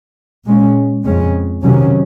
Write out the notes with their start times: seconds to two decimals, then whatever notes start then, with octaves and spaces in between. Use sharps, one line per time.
0.45 A#2 G#3 C#4
1.04 F2 C#3 G#3 C#4
1.63 C3 D#3 F#3 C#4